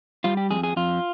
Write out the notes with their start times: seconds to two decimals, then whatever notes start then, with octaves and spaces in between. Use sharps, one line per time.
0.24 G3 F4
0.37 G4
0.51 F2 G#4
0.63 G#4
0.76 F2 F4